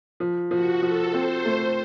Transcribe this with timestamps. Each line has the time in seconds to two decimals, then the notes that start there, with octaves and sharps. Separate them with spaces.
0.20 F3
0.51 F3 F#4
0.82 F3 A4
1.13 C4 C5
1.45 A3